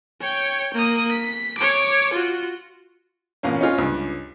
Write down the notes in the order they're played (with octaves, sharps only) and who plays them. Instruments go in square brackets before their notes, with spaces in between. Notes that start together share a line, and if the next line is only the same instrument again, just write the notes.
[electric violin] C#5 G5
A#3 D#6
B6
C#5 D6
F4 F#4
[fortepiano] A1 A#2 A#3 C#4
C#4 D#4 F4 G#5
C#2 G2